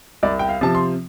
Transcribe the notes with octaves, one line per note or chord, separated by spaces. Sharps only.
C2 D5
G5
F5
C3 F3 A5
C6